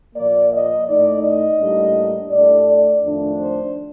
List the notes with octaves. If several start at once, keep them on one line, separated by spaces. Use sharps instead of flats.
A#2 F3 A#3 D5
D#5
A2 A3 D#4 D5
D#5
A2 G3 A#3 D4
A2 A3 D4 D5
D5
F2 D#3 A3 D4
C5